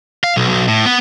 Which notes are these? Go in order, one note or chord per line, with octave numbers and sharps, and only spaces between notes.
F5
B1
B1
A2
B3